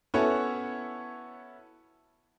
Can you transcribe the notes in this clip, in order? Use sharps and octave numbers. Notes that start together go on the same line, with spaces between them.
B3 C#4 E4 F#4 A4 C#5